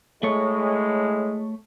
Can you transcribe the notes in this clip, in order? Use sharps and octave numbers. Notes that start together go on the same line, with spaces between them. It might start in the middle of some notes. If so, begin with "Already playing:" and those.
A2 G#3 A3 C#5